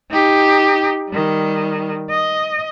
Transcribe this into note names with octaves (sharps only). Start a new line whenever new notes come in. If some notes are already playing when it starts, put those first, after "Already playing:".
D#4 G4
D#3 G3
D#5